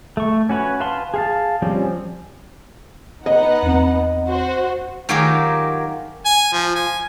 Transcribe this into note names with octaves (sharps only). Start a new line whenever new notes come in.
A3 C#6
C#4 F#4 B4 C#5
B4 F5 A5 B5 C6
G#4 F5 A5
F3 G3 C4 C#4
B3 D#4 D#5 F#5
E2 C4
F#4 C5
D#3 F#3 F4 G4 G#4 A#4
G#5
F3
G#5